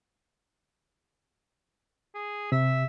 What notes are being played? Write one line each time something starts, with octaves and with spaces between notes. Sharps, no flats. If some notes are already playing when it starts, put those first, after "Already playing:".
G#4
C3 E5